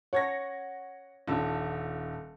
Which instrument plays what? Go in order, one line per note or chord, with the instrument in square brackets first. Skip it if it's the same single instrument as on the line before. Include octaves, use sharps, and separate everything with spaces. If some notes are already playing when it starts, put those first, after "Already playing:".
[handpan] C#5 [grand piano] F#5 G#6 A#6
[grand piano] D#1 D3 E6